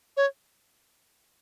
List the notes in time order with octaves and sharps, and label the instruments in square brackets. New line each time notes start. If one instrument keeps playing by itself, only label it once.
[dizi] C#5